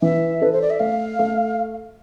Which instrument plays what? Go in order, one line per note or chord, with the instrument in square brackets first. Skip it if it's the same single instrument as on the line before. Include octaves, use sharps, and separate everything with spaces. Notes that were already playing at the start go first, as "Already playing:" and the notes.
[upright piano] E3 [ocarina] E5
[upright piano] A4 [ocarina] B4
[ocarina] C5
D5
E5
[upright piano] A3 [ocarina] F5
[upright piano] A3